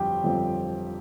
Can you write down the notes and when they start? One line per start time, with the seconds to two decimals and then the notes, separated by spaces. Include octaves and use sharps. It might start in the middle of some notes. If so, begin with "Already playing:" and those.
Already playing: G1 F2 F3 C4 G4 G5
0.23 G1 F2 F3 C4